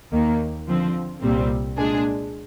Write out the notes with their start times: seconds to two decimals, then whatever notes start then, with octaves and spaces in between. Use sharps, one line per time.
0.12 D#2 D#3 A#3
0.67 D3 F3 C4
1.22 C2 A#2 G3 C4
1.77 A#2 G#3 D4 G#4